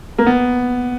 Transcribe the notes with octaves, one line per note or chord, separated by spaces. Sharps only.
A#3
B3